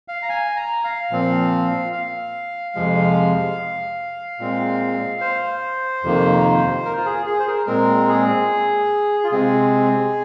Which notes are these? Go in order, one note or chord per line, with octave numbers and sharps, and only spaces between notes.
F5
A#5
G#5
A#5
F5
A#2 F3 C4
F5
F2 C3 F3 G#3
A#2 G#3 C4
C5
F2 C3 D#3 A#3
A#4
F4
G#4
G#4
C5
A#4
A#2 G#3 C4 A#4
G#4
F4
C3 G#3 C4 G#4